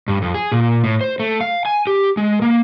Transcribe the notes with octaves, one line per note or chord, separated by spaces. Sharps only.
G2
F2
G#4
A#2
A2
C5
A3
F5
G#5
G4
G#3
A#3